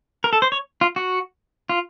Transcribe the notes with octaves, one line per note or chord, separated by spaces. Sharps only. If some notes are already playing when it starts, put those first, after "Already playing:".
A#4
A4
C5
C#5
F4
F#4
F4